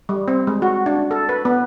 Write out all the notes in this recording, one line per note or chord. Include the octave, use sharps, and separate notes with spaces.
G3
C4
G#3
F#4
D4
A4
B4
B3